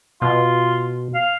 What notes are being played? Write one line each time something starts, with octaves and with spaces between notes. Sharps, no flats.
B2 F4
F5